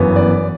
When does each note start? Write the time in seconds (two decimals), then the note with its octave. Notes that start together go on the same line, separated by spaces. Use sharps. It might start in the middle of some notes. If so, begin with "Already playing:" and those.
Already playing: G1 F#2 E3 B3
0.16 D5